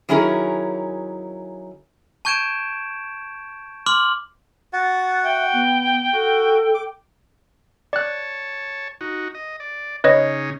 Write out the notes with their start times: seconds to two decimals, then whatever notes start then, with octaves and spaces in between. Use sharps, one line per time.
0.09 D#3 F#3 C#4 E4 G#4 A#4
2.25 A5 C#6 G6 G#6 D7 E7
3.86 C6 D6 F6 F#7
4.73 F#4 F#5 A6
5.24 E5 G5
5.53 B3
6.13 F#4 A4
6.74 D6
7.93 C#5 D5 A5 F#6
9.01 D#4 F#4
9.35 D#5
9.60 D5
10.04 C#3 C#4 D#4 B4 C#5 D#5